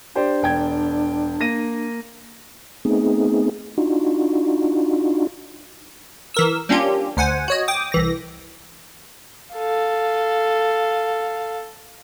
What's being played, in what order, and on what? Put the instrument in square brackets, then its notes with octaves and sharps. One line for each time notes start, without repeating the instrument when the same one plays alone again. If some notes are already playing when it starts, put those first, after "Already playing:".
[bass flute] D4 [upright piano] G4 C5 D5
[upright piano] E1 G5 G#6
A#3 A#6 D#7
[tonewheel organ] A3 B3 C4 D#4 G#4
D4 D#4 F4 F#4
[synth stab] E3 A#4 E6
G3 A#3 C#4 D4 F4 G4
D2 C5 F#5 G#5
F#4 C#5 D#5
G5 D6 D#6
C2 E3 A#6
[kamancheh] A4 F5